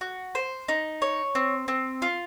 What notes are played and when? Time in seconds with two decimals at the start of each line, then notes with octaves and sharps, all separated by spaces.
0.01 F#4
0.35 C5
0.68 D#4
1.02 C#5
1.35 C4
1.68 C4
2.02 F4